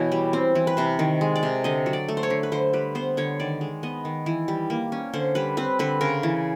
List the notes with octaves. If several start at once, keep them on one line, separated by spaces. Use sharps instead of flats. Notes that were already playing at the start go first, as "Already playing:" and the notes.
Already playing: B2 E3 C#5
G3
C4
E3
B4
C3 C5
D#3
G#3
D5
C3
D3 D#5
F#3
D5
A3
C5
C#5
D3
B4
D3 C5
G3 B4
B3 C5
D3 C#5
D#3 D5
G#3
B3 D#5
D#3
E3
G3
A#3
C#4
D3 C5
G3 B4
C4 B4
D3 B4
C#3 A#4
E3